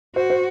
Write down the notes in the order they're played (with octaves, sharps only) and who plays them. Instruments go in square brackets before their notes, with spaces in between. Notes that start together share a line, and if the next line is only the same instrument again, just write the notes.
[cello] F#4 [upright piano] C5
[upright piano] C5